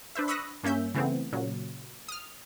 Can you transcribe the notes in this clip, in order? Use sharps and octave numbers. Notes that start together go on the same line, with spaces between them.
D4 B4 C5 E5
B5 C#6 D#6 E6 F#6 A#6
G2 A#3 C#4 E5 G6
C#3 E3 A3 B3 C4
A#2 C#3 F#3
D#6 F6